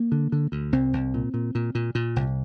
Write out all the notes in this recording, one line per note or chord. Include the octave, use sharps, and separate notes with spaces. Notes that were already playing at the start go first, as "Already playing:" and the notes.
Already playing: A#3
D3
D3
D2
C2 C4
C2
A#2
A#2
A#2
A#2
A#2
C2